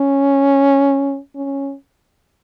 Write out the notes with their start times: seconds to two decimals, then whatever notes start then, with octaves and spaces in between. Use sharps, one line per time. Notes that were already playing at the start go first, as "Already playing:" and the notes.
Already playing: C#4
1.36 C#4